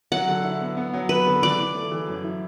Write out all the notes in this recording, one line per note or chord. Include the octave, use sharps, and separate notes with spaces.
F#3 F#5
D3
E4
B3
B3
F#3
B3 B4
D3
E3 D5
E3
A3
E3
F#2
E4